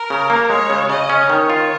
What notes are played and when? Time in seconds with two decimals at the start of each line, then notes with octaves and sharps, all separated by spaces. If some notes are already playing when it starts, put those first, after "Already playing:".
Already playing: A#4
0.10 C#3
0.30 A#3
0.50 G#3 C#5
0.70 C#3
0.89 C#3 D#5
1.10 C#4
1.29 D#3 C#5
1.50 F4